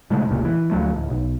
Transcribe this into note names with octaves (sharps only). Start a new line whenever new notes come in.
A#2 C#3 G#3 A3
F1 C#2 A#2
E3
D2 F3 F#3 A3
D1
B1